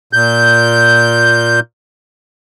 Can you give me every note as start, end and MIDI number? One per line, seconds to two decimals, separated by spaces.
0.13 1.60 46
0.13 1.60 91